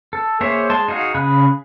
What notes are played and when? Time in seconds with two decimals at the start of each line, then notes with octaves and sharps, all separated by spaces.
0.13 A4
0.41 A#3 G#4 C5 C#5 E5
0.70 G#3 A5 C6
0.88 D#4 F#4 G#4 F5
1.15 C#3 G#4 B5 F#6